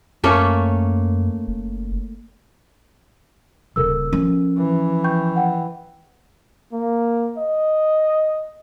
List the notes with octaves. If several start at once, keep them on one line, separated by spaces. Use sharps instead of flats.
F#2 A3 A#3 C#4
F#1
D#1 C#3 A4 A#4 E6
F3 C#4
E3
G5 C#6 G6
F#5 G5
A#3
D#5